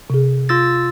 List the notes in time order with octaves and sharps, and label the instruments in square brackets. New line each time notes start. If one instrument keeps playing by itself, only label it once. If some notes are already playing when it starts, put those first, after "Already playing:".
[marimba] C3 G#4
[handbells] F4 E6 A6